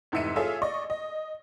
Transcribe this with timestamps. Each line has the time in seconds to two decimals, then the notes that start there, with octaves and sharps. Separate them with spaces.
0.12 F1 G#2 E3 E5 C#7 D#7
0.36 F4 G#4 A4 C#5 E5 F5
0.62 D5 D#5 C#6
0.90 D#5